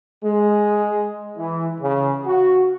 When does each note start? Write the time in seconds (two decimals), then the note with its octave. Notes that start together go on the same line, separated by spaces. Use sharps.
0.24 G#3
1.37 E3
1.81 C#3
2.26 F#4